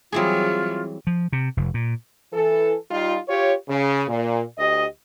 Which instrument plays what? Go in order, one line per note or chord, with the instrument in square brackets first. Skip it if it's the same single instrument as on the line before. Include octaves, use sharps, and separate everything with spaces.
[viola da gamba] E3 F#3 G3 [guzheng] C4 E4 G#4 [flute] F4
[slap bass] F3
C3
F1
A#2
[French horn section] E3 A4
G3 D#4 F4
F4 G4 C#5
C#3
A#2
D2 G4 D#5